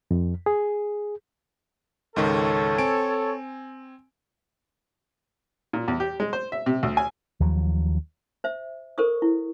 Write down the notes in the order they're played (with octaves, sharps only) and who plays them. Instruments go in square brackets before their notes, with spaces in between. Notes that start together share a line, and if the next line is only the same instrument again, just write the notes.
[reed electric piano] F2
G#4
[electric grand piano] C#2 G#2 D#3 [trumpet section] A4 C#5
[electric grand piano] C4 G#5 D7
[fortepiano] A#2
E2
G4
G#3
C5
E5
C3
D2
G#5
[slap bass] D#2 F3 F#3
[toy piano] C5 E5
A4 A#4 C5 C#6 D#6
E4